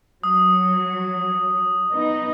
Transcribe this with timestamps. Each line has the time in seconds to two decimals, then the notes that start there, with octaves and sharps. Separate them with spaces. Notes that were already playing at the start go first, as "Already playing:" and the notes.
0.24 F#3 D#6
1.93 B3 D#4